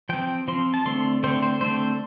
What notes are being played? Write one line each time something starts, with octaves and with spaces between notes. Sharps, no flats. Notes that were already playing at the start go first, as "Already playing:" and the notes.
F3 C4 G5
F3 C4 C6
A5
D3 A3 C4 C6
D3 A3 C4 C5
C5
D3 A3 C4 C5